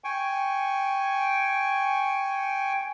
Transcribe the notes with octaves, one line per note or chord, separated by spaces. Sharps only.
G5 G#5 C#6